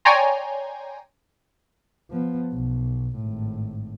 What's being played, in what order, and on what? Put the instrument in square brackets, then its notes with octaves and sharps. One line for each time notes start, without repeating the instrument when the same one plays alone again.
[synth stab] C#5 D5 G5 G#5 A#5 C6
[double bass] F3 B3
B1
G#1 A2